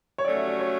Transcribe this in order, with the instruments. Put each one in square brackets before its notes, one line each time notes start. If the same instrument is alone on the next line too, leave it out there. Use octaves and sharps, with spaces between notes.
[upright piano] C#5
[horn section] F#3 A3 C#4 F#4 A4 [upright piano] D5
[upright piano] E5
D5
C#5